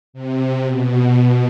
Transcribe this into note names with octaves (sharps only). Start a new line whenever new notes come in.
C3
B2
B2